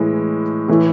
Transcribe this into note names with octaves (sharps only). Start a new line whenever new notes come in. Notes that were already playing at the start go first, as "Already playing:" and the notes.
Already playing: A2 E3 G#3
A2 E3 A3